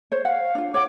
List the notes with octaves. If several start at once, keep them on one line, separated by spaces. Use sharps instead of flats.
C5 C#5
F5 F#5
D4 F4
C#5 F#5 D6